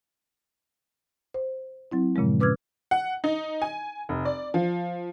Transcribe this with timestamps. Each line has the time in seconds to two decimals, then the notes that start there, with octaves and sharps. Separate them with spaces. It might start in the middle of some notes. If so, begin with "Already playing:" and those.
1.34 C5
1.91 F#3 C4 E4
2.16 G2 A#2 C#3 F3 G#3
2.40 C#4 B4 D6 E6 F6 G#6
2.91 F#5
3.24 D#4
3.62 G#5
4.09 F1
4.25 D5
4.54 F3